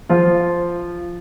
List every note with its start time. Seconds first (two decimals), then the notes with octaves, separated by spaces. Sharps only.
0.09 F3 F4